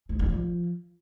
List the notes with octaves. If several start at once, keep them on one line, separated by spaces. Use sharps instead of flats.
G#3
G3
F3